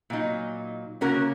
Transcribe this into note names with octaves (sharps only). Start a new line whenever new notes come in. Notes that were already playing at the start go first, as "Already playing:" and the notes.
A#2 F#3 D#4
C#3 A#3 C#4 F#4 A#4